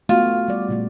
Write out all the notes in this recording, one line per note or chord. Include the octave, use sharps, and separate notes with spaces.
A3 B3 F4 F#4
G3 D5
A#2 C#3 A3